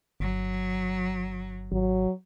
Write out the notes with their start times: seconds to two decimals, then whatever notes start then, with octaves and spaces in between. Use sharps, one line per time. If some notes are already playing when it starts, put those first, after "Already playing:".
0.20 G1 F#3
1.72 G#1 F#3